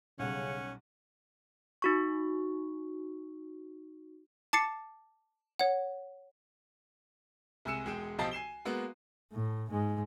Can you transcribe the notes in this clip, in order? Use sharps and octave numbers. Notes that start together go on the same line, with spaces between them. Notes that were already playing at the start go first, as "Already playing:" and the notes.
B1 C#3 G3 C#4 F#5
D#4 F#4 C#6
A5 D6 A6 C7 C#7
C#5 F#5
C2 G#3 G#5 E6 C#7 E7
E1 G#3 G#4 G5 E7
B1 F3 G4 D#5 A5 C7
G#5 C7 E7 G7
G#3 A#3 B3 F#4
A2
G#2 G#3